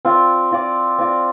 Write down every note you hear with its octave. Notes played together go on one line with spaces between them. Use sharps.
C4 F4 D5
C4 F4 D5
C4 F4 D5